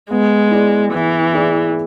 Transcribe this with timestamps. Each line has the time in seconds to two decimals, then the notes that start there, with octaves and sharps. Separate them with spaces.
0.11 G#3 B3
0.51 E4 G#4 D5
0.93 E3 B3
1.34 E4 G#4 D5